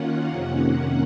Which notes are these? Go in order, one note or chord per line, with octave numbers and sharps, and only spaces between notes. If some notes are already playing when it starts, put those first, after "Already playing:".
Already playing: D#3 A#3 C#4 F4 F#5
F2 C3 D#3 A#3 C#4